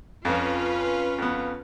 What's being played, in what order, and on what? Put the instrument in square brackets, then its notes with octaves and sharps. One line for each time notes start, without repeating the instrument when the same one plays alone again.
[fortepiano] F2 [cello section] C#4 F4 B4
[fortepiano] F2 B3